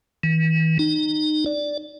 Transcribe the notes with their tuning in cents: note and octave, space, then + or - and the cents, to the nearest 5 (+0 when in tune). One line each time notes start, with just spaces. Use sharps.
E3 -40
D#4 -25
D5 -5